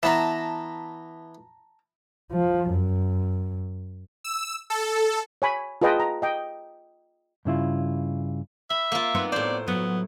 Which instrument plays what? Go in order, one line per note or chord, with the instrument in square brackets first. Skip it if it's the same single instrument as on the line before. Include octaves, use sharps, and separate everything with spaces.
[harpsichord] E3 B3 [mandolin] A5 A#5
[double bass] F3
F#2
[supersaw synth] E6
A4
[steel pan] C#5 G#5 B5
F4 G#4 B4 D#5 G5 A5
A#5
D#5 G5
[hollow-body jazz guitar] G2 C#3 E4 F4
[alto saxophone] E5 [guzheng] B5
[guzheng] A#3 F4
[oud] B3 C4 D#4
[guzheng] A2 C5 [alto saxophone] D5
[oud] F#3 [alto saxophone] B3